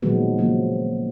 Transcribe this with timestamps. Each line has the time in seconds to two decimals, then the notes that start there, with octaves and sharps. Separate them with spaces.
0.02 A#2 D#3 F3 F#3 G#3 B3
0.38 C#3 F3 F#3 A#3